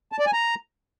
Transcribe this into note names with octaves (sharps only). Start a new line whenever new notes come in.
A5
D5
G#5
A#5